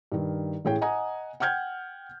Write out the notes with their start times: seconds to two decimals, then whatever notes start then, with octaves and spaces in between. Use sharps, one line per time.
0.12 G2 D#3
0.65 A1 A2 G#4 C#5 G5
0.81 D#5 F#5 G#5 A#5 D#6
1.40 F#5 G5 F6 G6 G#6